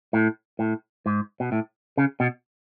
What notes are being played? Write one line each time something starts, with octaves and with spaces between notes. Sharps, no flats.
A2
A2
G#2
B2
A2
C#3
B2